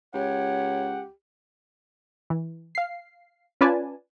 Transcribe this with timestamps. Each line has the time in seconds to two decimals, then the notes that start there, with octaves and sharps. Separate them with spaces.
0.14 C#2 G4 C#5 F#5
2.30 E3
2.75 F5 C7
3.61 C#4 F4 B4 D5 G#5 A5